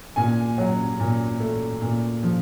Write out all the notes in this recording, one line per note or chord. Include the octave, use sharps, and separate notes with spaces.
A#2 G#5
F#3
A#2
A3
A#2
F3